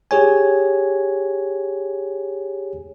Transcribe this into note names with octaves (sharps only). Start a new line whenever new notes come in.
G4 G#4 C#5 G#5